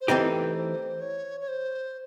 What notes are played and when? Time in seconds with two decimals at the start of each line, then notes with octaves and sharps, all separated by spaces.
0.01 C5
0.08 E3 A3 C4 D#4 G4 B4
0.55 C5
1.01 C#5
1.40 C#5
1.48 C5